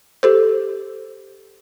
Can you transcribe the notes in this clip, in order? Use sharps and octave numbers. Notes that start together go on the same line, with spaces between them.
G4 A4 C5